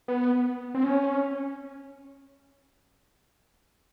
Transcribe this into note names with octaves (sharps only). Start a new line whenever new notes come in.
B3
C4
C#4